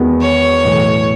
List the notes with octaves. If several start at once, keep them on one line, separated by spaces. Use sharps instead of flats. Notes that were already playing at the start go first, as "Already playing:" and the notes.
Already playing: E2 D#3 G#3 B3 F#4
C#5
B1 A2 E3